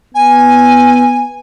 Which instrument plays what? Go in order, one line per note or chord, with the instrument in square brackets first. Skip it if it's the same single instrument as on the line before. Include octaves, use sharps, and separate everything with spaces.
[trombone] B3 [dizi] G#5